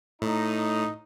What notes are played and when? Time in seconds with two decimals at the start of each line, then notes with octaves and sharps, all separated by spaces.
0.22 A2 D#4